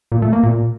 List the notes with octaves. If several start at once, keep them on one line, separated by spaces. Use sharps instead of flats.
A#2
A3
A#3
A#2